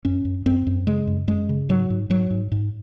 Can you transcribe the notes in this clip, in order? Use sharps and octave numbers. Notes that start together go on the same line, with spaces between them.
F#2 C#4
F#2
F#2 C4
F#2
C#3 G#3
F#2
F#2 G#3
C#3
G#2 F#3
G#2
G#2 F#3
G#2
G#2